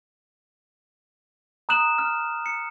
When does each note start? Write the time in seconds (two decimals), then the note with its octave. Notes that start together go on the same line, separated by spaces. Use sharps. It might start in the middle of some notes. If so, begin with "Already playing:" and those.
1.69 A#5 D#6 F#6 E7 F#7
1.98 F6
2.46 C#7